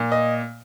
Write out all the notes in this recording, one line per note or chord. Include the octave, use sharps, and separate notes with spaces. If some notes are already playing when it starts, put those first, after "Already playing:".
Already playing: A#2
D#5